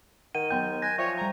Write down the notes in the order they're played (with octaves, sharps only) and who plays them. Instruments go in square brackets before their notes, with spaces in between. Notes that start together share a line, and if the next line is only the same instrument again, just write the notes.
[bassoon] D#3 [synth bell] F#5 [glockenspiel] D#7
[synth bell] F#3 B3 G5 [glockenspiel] G6
[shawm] G#5 [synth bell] F#6 [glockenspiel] A#6
[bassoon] F3 [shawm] C#5 [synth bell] D5 E5 G5
[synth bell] G3 G5 [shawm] A#5